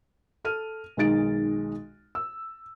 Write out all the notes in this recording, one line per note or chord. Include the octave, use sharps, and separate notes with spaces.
A4 F6 D#7
B1 D#3 G#3 D#4 A6 D7
E6